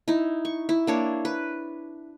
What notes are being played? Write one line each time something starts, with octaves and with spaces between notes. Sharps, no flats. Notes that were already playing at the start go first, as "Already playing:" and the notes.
D#4 E4
C#6
E4
A#3 D4 C#5
B4